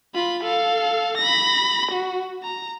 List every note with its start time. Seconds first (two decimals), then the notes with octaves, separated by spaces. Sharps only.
0.15 F4 B5
0.44 A4 F5
1.18 B5 A#6
1.92 F#4
2.43 A#5